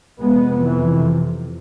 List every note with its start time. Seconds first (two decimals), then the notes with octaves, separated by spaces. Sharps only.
0.20 F2 C3 G#3 B3
0.64 E3